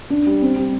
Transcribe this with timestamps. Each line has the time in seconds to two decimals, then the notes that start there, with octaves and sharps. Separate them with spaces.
0.10 D4
0.26 G3
0.42 C4
0.57 G3